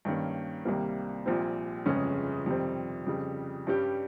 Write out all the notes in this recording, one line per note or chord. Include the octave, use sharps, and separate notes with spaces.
G2 D#3 A#3 C#4
C2 C3 D#3 G3 A#3
A#1 A#2 G3 C4
G1 F2 C#3 G#3 C#4
F2 C3 D#3 G3 C4
F2 C#3 G3
G2 G3 C#4 G4